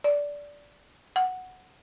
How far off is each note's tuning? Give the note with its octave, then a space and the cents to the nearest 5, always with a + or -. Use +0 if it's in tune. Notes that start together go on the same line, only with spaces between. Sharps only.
D5 -15
F#5 +0